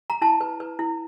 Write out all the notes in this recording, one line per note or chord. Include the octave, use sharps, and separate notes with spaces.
A#5
E4 A5
B4
B4
E4